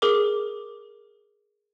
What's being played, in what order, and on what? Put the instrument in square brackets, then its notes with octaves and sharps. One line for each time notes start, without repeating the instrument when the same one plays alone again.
[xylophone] G#4 A#4 D6